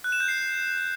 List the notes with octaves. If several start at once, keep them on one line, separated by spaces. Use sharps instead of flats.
F#6
E7
G6
C7